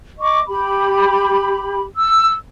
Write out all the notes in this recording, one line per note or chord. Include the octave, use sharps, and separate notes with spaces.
D#5 C#6 D6
G4 B5
E6